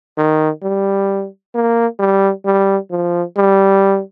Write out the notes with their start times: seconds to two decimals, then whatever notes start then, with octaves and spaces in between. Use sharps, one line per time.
0.18 D#3
0.63 G3
1.55 A#3
1.99 G3
2.45 G3
2.91 F3
3.37 G3